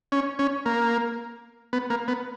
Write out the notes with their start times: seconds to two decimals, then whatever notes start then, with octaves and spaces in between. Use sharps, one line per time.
0.12 C#4
0.39 C#4
0.66 A#3
1.73 B3
1.90 A#3
2.08 B3